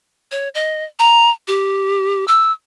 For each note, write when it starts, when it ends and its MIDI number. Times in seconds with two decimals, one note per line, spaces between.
0.31 0.49 73
0.55 0.84 75
0.99 1.30 82
1.48 2.25 67
2.28 2.52 88